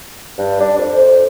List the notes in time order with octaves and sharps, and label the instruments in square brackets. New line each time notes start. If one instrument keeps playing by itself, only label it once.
[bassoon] G2
D4
F2
[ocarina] C5